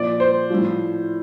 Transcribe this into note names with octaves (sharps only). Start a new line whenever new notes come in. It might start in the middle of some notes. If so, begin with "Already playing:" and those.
Already playing: A#2 F3 D5
C5
A2 F3